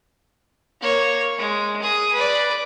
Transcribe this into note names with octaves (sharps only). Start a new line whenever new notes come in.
A#3 C#5
G#3
G#4 D#6
B4 D5